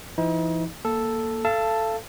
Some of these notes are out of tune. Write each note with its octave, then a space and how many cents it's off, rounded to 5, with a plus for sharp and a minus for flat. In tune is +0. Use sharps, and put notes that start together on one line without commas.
E3 +40 D#4 +40
A#3 +0 A4 +0
A4 +0 F5 -35 A5 +5